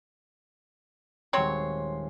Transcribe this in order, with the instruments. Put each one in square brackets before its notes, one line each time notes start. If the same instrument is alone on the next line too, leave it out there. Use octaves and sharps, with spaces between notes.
[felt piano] D#1 G#3 C6 [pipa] F#3 C4 C#5